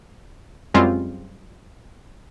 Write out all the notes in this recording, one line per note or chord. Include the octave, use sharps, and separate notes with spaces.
F#2 G3 G#3 C4 C#4 F4